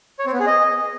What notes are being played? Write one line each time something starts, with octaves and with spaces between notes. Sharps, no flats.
C#5
C4
B3
G#4
D#5